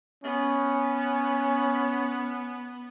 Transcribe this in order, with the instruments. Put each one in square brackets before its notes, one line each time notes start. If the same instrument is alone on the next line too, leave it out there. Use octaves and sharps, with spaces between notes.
[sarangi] B3 [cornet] C#4